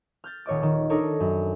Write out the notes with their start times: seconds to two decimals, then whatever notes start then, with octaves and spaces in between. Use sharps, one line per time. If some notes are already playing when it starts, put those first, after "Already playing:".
0.24 F6 G6 A6
0.46 D#1 C#5 D#5 D6
0.63 D#3
0.90 D4 D#4 A4 A#4 C#5 D5
1.20 F#2